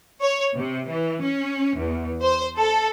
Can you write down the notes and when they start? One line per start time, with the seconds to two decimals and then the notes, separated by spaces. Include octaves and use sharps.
0.21 C#5
0.55 C3
0.87 E3
1.21 C#4
1.78 E2
2.22 C5
2.57 A4